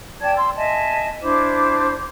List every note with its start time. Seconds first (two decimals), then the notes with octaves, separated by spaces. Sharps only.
0.21 D5 G5 A5 G#6
0.36 C6 E6
0.56 D#5 E5 G#5 A5
1.22 D4 E4 C5 D6